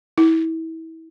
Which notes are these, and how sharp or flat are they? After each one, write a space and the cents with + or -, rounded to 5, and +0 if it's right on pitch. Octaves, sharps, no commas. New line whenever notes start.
E4 -30